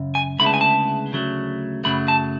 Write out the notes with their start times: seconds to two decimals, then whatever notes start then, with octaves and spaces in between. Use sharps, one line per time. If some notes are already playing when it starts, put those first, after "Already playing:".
Already playing: F#2 C#3
0.15 G#5
0.39 D2 C#3 G#3 B3 E4 B5
0.46 A5
0.54 G#5
0.61 A5
1.12 D2 C#3 F#3 A3
1.84 F#2 C#3 F#3 A3 B5
2.08 A5